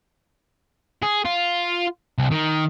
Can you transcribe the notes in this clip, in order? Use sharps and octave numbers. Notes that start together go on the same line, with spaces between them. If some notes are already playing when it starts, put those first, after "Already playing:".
G#4
F4
C2
D#3